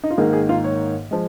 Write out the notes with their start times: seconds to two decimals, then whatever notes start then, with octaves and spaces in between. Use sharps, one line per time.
0.04 D#4
0.10 F4
0.18 G#1 G#2 D#3 A#3 G#4
0.33 G#4
0.49 F4
0.64 C#5
1.11 F3 G#3